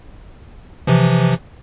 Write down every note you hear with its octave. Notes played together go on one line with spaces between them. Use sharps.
C3 E3 F3